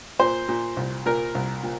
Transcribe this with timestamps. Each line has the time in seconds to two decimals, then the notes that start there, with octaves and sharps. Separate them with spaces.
0.19 A#2 C5
0.49 A#2
0.77 C2
1.06 A#2 A#4
1.35 C2
1.63 A#2